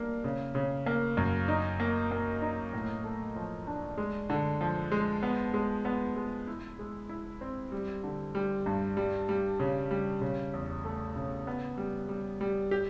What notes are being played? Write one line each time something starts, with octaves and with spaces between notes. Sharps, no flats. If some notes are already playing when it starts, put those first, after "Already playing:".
Already playing: G3 A#3 D4
C#3
C#3
A#3
F#2
D#4
A#3
A#3
D#4
A2
A3
F3
D4
G#3
D3
F3
G#3
B3
G#3
B3
G#3
E4
G#3
E4
C4
G3
D3
G3
G2
G3
G3
C#3
G3
C#3
E2
A3
C#3
B3
G3
G3
G3
G4